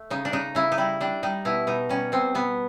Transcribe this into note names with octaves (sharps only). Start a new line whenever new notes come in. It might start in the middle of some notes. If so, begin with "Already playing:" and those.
Already playing: A3
C#3 D#4
D4
C#3 D#4
C#3 E4
D#4
G3 E4
G3 D4
G3 D#4
B2 E4
B2 D#4
G3 C#4
B2 C4
B2 B3